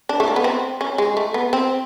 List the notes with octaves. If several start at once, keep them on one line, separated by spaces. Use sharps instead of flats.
D4
A3
A#3
B3
C4
C#4
G#3
A3
B3
C4